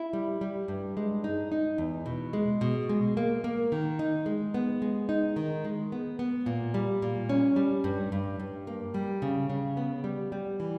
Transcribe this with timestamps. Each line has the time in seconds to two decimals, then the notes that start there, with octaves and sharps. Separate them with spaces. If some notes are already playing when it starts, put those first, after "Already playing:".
Already playing: E4
0.13 G3
0.41 G3
0.68 G2
0.97 G#3
1.24 D#4
1.52 D#4
1.78 E2
2.06 B2
2.33 G#3
2.61 B2
2.89 G#3
3.17 A#3
3.44 A#3
3.72 D#3
3.99 D#4
4.26 G#3
4.54 B3
4.82 G#3
5.09 D#4
5.36 D#3
5.64 G#3
5.92 B3
6.19 B3
6.46 A#2
6.74 G3
7.02 A#2
7.29 C#4
7.56 G3
7.84 G2
8.12 G2
8.40 G2
8.67 A#3
8.94 G3
9.22 C#3
9.50 C#3
9.77 B3
10.04 G3
10.32 G3
10.60 E3